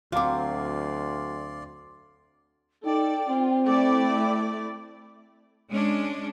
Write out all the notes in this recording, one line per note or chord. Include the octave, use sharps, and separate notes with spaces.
D2 F#3 C4 D5 F5 C6 D6
D#4 A4 D5 G5
C4 F4
A3 E4 D5
G#3 C#4 D4